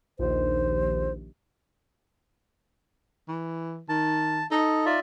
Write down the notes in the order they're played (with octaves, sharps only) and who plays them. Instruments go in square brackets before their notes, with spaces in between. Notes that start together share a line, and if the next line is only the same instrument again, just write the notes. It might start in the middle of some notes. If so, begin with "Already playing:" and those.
[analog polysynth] A#1 D#2 [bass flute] C5
[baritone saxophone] E3
[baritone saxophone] D#3 [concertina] A5
[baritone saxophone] D#4 [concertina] A4 D#5
[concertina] F4 D5 E5